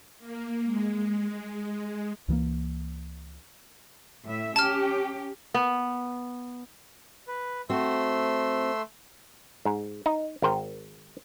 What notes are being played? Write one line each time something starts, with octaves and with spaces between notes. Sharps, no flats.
A#3
G#3
C#2 E3 F3 A#3
A2 E5
C#4 G4 A5 F6
B3
B4
A3 C4 F#4 C6 E6
G#2
D#4
G#1 A#4 C5 G5